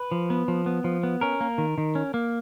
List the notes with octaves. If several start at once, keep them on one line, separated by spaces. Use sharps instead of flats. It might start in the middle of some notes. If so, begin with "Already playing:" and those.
Already playing: B4
F3
B3
F3
B3
F3
B3
C#4 A#4
A#3
D#3
D#3
C#4
A#3